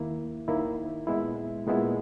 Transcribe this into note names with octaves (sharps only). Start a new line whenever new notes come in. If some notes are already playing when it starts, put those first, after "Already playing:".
Already playing: D#2 D#3 A#3 E4
D#2 D#3 A#3 E4
A#2 G#3 B3 E4
A#2 G#3 B3 E4